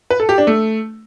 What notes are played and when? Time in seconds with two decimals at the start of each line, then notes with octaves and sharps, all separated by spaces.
0.10 B4
0.20 A4
0.29 G4
0.38 D4
0.47 A3